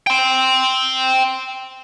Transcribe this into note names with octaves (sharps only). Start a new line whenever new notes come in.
G5 C6